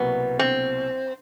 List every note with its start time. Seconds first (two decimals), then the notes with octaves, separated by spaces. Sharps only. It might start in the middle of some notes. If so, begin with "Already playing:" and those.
Already playing: C2 B2 F#3 A#3 B3
0.39 C4